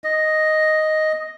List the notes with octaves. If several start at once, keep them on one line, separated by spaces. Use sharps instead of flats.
D#5